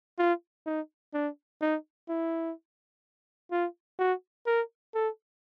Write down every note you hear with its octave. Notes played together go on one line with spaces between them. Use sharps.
F4
D#4
D4
D#4
E4
F4
F#4
A#4
A4